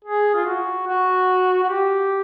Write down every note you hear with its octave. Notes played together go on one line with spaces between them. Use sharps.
G#4
F4
F#4
F#4
F#4
G4